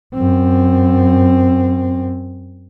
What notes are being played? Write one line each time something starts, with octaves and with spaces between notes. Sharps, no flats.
F#2 C4